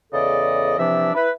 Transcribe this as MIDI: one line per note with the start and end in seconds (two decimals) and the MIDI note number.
0.13 0.79 40
0.13 0.79 49
0.13 0.79 69
0.13 0.79 74
0.13 0.79 75
0.79 1.10 48
0.79 1.10 52
0.79 1.10 53
0.79 1.10 62
0.79 1.10 74
0.79 1.10 76
1.15 1.29 64
1.15 1.29 71